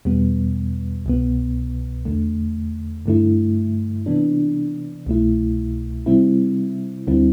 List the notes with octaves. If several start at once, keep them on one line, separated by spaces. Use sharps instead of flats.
E2 B2 G3 B3
C2 B2 B3
E2 D3 A3
G2 D3 A3 E4
C3 E3 B3 D4
C2 B2 A3 E4
C3 G3 C4 E4
D2 D3 G3 C4 E4